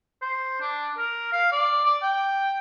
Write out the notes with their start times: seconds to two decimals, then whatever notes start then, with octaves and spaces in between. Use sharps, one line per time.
0.22 C5
0.61 D4
0.98 A#4
1.33 F5
1.52 D5
1.84 D5
2.03 G5